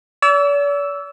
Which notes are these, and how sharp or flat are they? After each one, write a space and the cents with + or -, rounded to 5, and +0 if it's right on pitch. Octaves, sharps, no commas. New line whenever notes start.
D5 -45 E6 +0